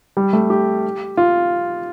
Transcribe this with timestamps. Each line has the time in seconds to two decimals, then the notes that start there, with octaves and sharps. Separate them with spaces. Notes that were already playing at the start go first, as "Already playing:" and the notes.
0.17 G3
0.33 A3
0.50 G4
1.17 F4